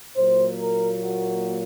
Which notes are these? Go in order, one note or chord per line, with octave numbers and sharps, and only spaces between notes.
A#2 F#3 A#3 C5
A#4
F#4